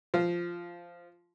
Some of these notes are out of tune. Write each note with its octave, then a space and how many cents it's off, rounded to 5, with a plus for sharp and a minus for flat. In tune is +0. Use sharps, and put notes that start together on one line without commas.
F3 -10 F5 -5